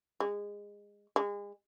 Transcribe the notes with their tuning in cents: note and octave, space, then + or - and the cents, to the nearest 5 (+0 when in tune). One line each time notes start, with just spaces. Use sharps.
G#3 -20
G#3 -35